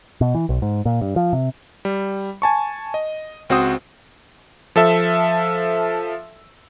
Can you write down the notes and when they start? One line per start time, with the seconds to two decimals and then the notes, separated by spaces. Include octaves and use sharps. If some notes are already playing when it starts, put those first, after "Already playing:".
0.21 B2
0.35 E3
0.49 B1
0.62 G#2
0.85 A#2
1.01 G2
1.16 F3
1.33 C3
1.85 G3
2.42 G#5 A5 C#6
2.94 D#5
3.50 C#2 C4 F#4 C5 D#6
4.76 F3 A4 E5 E6